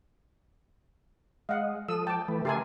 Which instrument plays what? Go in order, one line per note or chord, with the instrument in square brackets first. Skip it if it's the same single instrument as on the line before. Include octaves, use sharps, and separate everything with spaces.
[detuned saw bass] G#3 [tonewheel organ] D#5 [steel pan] F5 F#5
[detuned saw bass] F3 [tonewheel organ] A4 D#6 [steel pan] E6
[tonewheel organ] G5 [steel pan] A5 D6
[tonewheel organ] E3 B4 [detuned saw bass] A3
[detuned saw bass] C#3 [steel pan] G4 A#4 G#5 [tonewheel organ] E5 A5 C6